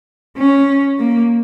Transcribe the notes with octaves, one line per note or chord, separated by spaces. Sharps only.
C#4
A#3